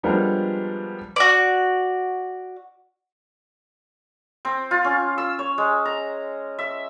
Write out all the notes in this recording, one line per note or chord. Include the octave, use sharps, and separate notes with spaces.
F3 G3 G#3 B3 D4 A#4
F#4 D5
C4
F4
C#4
E6
C#5
G#3
A#5
E5